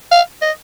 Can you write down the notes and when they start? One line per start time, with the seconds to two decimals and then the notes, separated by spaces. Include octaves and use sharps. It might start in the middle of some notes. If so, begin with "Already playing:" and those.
0.12 F5
0.42 D#5